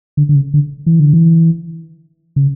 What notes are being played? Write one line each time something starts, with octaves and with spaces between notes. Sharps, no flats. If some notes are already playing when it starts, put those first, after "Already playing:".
D3
D3
C#3
D3
E3
D3
E3
C#3